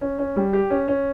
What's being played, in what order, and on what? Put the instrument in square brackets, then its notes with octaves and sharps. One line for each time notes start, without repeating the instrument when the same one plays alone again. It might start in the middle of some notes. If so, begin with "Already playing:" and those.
[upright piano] C#4
C#4
G3
G4
C#4
C#4